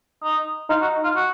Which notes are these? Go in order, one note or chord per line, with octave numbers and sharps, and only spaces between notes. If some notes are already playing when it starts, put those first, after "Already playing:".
D#4
D#4 F4
F#4
F4
F#4